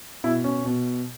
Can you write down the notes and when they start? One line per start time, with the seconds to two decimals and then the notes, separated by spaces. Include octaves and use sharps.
0.24 B2 E4
0.44 C#4
0.65 B2